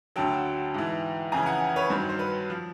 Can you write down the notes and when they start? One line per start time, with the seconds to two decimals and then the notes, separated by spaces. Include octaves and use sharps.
0.16 D2 D3 F#3 G5 A5
0.74 G#2 E3
1.32 F2 C#3 E3 G#5 A#5
1.46 F#5 G#5
1.76 B4 C#5
1.90 G2 D#3 F#3 C5
2.09 C5
2.19 B4
2.50 F3